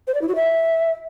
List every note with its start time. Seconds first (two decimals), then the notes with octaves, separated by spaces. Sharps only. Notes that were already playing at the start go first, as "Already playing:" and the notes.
0.07 C5
0.14 D5
0.21 E4
0.28 F#4
0.35 E5